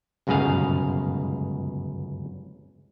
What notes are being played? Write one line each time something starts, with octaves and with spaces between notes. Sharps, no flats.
G1 C#2 F#2 B2 G#4 F5